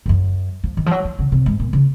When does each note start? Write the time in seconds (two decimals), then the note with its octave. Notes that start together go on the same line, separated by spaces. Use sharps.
0.06 G#2
0.09 F#2
0.64 F3
0.77 D#3
0.86 F3
0.91 F#3
1.05 F3
1.19 C#3
1.32 C3
1.46 G#2
1.60 A#2
1.73 C#3